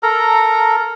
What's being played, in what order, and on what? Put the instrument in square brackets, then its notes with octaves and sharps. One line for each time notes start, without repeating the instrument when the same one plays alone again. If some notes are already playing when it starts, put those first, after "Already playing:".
[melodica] A4 A#4 A#5